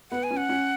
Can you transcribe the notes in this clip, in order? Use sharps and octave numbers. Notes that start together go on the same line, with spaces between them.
B3 F#5
G#5
C#4
F#5
C#4